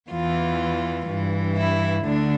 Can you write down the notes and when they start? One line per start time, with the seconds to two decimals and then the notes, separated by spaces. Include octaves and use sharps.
0.11 E2 E3 F4
1.09 G2 E3
1.57 E4
2.06 D2 D3 D4